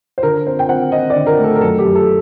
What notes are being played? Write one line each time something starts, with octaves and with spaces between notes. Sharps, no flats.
C5
D3 A#4
C4 C5
G5
C4 F#5
C4 D#5
D5
D3
A#4
A3
A4
A#4
F#2 A4
G4
F#2
A4